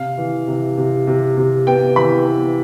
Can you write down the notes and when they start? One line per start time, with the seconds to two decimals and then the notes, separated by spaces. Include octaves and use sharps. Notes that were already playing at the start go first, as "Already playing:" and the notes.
Already playing: C3 F5
0.18 E3
0.48 C3
0.77 C3
1.07 C3
1.37 C3
1.67 B3 G5
1.96 E3 B5
2.27 B3